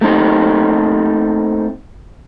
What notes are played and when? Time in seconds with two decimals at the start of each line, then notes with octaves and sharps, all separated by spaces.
0.01 A3 A#3 C4 D#4